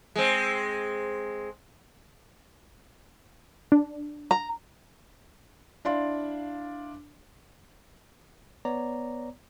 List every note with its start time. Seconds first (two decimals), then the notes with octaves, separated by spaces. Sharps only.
0.16 G#3 C4
3.72 D4
4.31 A#5
5.85 D4 E4 D5 F5 C6
8.65 B3 C#5 D5 A#5